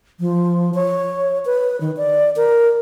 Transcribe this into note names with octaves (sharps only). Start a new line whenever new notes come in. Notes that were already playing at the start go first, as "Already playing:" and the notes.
F3
C#5
B4
D#3
D5
A#4